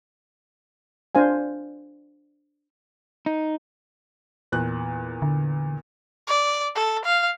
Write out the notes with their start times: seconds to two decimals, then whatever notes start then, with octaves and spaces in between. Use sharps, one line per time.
1.15 D4 C5 F5 G#5
3.26 D#4
4.52 E2 A#2 F#6
5.22 D3
6.28 D5
6.75 A4
7.05 F5